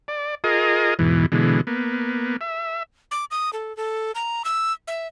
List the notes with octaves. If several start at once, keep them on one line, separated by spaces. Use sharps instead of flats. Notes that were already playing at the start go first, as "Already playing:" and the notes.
D5
F4 G#4 A#4 D#5
E2 G#2 B2 E3
B2 D3 E3 G#3
A#3 B3
E5
D6
D#6
A4
A4
A#5
E6
E5